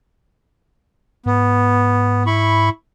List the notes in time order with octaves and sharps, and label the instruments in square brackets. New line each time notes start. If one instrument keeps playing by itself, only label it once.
[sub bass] G#2 [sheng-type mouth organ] B3
[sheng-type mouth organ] E4 B5 C#6